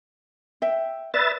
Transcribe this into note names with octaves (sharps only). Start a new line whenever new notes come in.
E5 G5
B4 D5 E5 A6